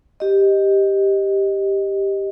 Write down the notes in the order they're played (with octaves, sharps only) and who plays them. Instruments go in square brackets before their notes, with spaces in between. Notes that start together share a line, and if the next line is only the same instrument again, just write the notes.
[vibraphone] G4 D#5